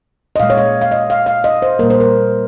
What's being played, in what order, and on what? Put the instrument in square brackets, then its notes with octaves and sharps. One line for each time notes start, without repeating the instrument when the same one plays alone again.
[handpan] D#5
A#2 G#3 F5
C#5
D#5
F5
D#5
F5
F5
D#5
C5
A#2 G3 A#3 A#4
C5
A#4